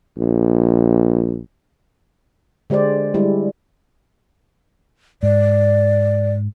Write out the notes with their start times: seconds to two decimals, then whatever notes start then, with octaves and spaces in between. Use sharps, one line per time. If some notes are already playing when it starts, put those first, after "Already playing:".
0.18 A#1
2.70 D3 G#3 G4 C5 D5
3.14 G3 G#3 E4
5.23 G#2 D5